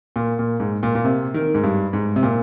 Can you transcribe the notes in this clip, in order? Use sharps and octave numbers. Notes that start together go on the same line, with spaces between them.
A#2
A#2
G#2
A#2
A#2
C3
D#3
G#2
G2
G#2
C3
A#2